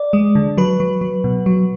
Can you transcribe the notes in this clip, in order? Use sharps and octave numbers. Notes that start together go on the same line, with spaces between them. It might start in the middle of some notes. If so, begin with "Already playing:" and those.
Already playing: D5
G#3
D3
F#3 B4
F#3
F#3
B2
F#3